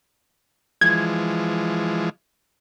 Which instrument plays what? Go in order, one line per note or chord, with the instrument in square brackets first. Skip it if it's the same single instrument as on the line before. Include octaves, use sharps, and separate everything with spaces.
[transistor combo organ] E3 F3 G#3 [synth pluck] G#6